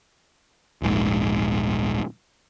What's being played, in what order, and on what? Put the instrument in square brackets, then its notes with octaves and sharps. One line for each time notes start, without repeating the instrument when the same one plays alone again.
[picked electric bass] D#1 A#1 G#2